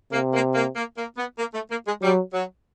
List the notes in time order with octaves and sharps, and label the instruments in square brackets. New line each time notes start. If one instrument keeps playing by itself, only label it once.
[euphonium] C3 [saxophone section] A#3
[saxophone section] A#3
A#3
A#3
A#3
B3
A#3
A3
A#3
G#3
[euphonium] F#3 [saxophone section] G3
[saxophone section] F#3